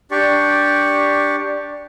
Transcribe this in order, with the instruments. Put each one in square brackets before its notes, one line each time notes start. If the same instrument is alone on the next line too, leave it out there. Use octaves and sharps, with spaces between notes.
[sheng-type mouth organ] D4 G4 D5 C#6